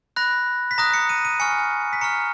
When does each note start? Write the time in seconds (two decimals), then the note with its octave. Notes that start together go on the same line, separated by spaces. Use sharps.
0.16 B5 F#6 A#6
0.71 B6
0.78 A#5 D#6 F#6 A#6
0.94 C#7
1.09 D#7
1.25 D#7
1.40 G#5 C#6 F6 C#7
1.93 B6
2.01 A#5 C#6 F6 C#7